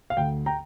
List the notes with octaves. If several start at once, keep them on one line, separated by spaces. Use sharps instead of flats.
F5
D2 G5
G5 A#5